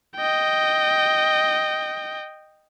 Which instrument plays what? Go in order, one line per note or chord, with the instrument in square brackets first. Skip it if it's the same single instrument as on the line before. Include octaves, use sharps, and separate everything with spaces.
[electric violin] D#5 G5